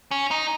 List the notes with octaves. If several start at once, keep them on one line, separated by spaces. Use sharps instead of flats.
C#4
D#4